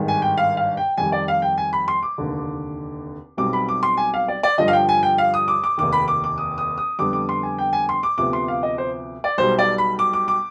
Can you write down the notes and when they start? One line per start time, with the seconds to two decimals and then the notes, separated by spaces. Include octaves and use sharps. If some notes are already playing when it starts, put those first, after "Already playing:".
Already playing: G#1 G2 D#3 G#3
0.08 G#5
0.22 G5
0.37 F5
0.57 F5
0.77 G5
0.97 F2 D#3 G3 G#5
1.12 D5
1.28 F5
1.42 G5
1.58 G#5
1.73 B5
1.88 C6
2.03 D6
2.18 F1 D#2 D3
3.37 B1 B2 G3 C4 D6
3.53 B5
3.68 D6
3.83 C6
3.97 G#5
4.14 F5
4.28 D5
4.43 D5
4.58 G2 D3 F3 D#5
4.68 F5
4.73 G5
4.89 G#5
5.03 G5
5.18 F5
5.34 D#6
5.48 D6
5.64 D6
5.78 F1 D#2 D#3 D6
5.93 B5
6.08 D6
6.24 D6
6.38 D#6
6.58 D#6
6.78 D#6
6.99 F2 D3 G3 B3 D6
7.13 D6
7.29 C6
7.43 G#5
7.58 G5
7.73 G#5
7.89 C6
8.03 D6
8.18 D2 C3 F3 B3 D6
8.33 C6
8.48 F5
8.63 D#5
8.78 C5
9.24 D5
9.38 B1 B2 G3 C5
9.59 D5
9.78 B5
9.99 D6
10.13 D6
10.28 D6